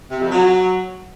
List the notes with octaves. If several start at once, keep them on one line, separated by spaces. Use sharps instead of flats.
C3
F2
F#3